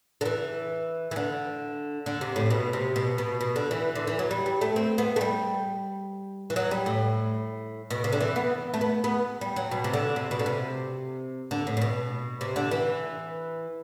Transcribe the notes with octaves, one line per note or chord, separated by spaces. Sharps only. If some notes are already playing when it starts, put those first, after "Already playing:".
D3
E3
E3
D3
D3
C3
A2
B2
C3
B2
B2
B2
D3
E3
D3
E3
F#3
G3
G3
A3
C4
B3
A3
G3
E3
F#3
G3
A2
B2
C3
D3
E3
B3
A3
B3
B3
G3
F#3
B2
C3
D3
C3
B2
D3
C3
D3
A2
A2
B2
C3
D3
E3